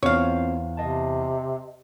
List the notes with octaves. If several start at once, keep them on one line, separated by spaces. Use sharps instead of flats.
E2 C4 F4 C5 C#5 F5
C3 D#5 A5